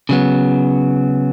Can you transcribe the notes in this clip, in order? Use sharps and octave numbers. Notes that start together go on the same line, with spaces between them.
C#3 F#3 B3